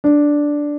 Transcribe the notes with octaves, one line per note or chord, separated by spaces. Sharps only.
D4